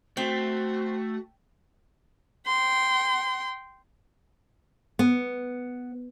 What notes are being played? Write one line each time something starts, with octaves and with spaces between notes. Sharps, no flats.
A3 C4 F#4
G5 C6
B3